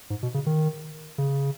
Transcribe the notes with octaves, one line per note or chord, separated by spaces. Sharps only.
G#2
B2
C#3
D#3
C#3